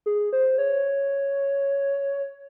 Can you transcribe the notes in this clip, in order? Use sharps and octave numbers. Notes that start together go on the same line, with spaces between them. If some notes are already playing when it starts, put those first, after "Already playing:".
G#4
C5
C#5